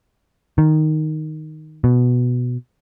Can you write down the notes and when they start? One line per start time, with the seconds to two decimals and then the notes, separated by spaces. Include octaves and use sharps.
0.58 D#3
1.84 B2